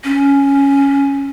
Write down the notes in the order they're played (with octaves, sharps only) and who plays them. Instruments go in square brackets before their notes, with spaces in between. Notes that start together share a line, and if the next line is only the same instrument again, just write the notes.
[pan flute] C#4